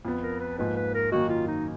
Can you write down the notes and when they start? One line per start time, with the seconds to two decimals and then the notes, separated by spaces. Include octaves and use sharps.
0.05 F2 F3 B3
0.23 A#4
0.40 B4
0.58 G#2 F3 A#3 D#4 B4
0.76 B4
0.94 A#4
1.11 F#2 D#3 A#3 D#4 F#4
1.29 F4
1.48 D#4